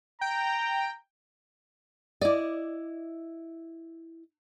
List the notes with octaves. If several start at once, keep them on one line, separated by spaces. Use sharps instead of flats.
G5 A#5
E4 D5 D#5